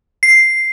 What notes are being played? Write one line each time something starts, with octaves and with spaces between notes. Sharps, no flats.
C7